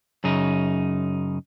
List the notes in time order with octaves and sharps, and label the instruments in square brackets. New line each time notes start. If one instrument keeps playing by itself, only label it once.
[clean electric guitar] F#2 C#3 D#4